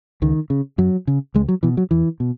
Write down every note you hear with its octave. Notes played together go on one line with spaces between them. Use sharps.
C#2 D#3
C#3
F#2 F#3
C#3
C#2 G#3
F#3
B2 E3
F#3
E2 E3
B2